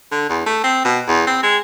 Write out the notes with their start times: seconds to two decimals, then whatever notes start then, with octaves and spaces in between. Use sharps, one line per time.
0.11 D3
0.30 E2
0.46 A3
0.64 C4
0.85 B2
1.07 E2
1.27 C4
1.43 G#3